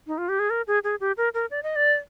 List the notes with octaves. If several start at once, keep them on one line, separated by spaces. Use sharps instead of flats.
D#4
F4
G4
G#4
A#4
G#4
G#4
G4
A#4
A#4
D5
D#5
D5